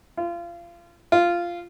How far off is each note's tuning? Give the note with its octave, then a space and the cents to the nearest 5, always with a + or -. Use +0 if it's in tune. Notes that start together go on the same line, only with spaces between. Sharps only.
F4 -30
F4 -10